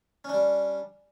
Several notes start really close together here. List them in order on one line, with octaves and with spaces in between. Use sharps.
C#4 D4 G3